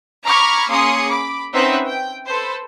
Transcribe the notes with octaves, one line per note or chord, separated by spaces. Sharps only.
A#5 B5 C#6 D6 F6 G#6
A#3 C#4 G#4 C6 D#6 C#7
B5 D6
C4 C#4 D#4 B4 E5 F#5
G5
A4 B4 C5